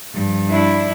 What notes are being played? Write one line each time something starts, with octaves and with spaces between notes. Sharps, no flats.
G2 F3
D4 E4